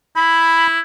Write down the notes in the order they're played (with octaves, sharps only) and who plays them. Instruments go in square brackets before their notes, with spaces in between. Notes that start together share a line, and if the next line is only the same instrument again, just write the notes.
[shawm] E4 [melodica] B5